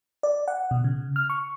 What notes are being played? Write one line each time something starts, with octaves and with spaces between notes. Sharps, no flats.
D5
F#5
B2
C#3
F6
C#6